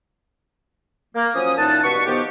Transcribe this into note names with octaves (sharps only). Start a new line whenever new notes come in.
A#3
F3 F#3 C#4 D#6
A#2 E3 D#4 A#4 F#5 A5
G2 B2 B4 F#5 C#6
D#3 F3 B3 G4